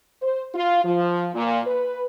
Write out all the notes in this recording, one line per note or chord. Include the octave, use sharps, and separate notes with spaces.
C5
F4
F3
A#2
B4